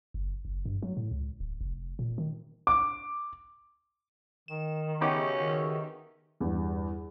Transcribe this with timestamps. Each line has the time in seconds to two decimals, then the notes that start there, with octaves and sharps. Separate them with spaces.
0.14 F#1
0.45 F#1
0.65 G2
0.82 F#3
0.97 A2
1.11 C#2
1.40 D1
1.61 F1
1.99 A#2
2.18 D#3
2.67 D6
4.48 D#3 E7
5.01 C#3 B3 C#4 D#4 F#4 G4 E5
5.38 D#3
6.40 E2 G2